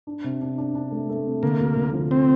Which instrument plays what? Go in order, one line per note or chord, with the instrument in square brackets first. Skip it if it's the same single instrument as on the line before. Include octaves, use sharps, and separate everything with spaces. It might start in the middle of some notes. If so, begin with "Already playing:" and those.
[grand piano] D4
C3
D4
D4
D4
A3
A3
C3
[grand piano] D3 [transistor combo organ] A#3
[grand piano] D2
D3
F3
[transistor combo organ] C4